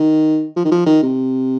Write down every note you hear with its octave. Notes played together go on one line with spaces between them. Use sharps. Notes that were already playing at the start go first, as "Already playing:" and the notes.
Already playing: D#3
F3
D#3
F3
D#3
C3